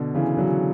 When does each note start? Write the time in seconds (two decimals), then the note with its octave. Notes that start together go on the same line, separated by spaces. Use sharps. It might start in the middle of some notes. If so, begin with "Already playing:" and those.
Already playing: B2 D3
0.15 C#3 E3
0.37 D3 F#3